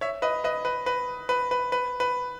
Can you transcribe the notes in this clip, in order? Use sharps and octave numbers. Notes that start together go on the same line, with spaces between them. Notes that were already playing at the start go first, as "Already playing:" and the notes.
C#5 E5
B4 D#5
B4 D#5
B4
B4
B4
B4
B4
B4